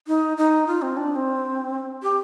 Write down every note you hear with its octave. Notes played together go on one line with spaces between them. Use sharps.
D#4
D#4
F4
C4
D4
D4
C4
G4